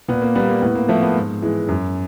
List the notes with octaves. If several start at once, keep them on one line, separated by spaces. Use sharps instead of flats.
A#2 B3
A#3
G3 A#3 B3
A#3
A2 B3
A#3
F3 A3 A#3
B3
G#2
E3 G#3
F#2